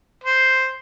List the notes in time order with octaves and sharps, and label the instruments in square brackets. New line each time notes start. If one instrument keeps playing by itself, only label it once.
[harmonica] C5